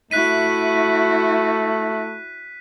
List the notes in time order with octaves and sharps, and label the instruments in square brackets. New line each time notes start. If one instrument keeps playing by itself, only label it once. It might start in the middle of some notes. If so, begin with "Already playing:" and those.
[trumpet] A3 [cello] E4 F#4 [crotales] F#6 B6 D#7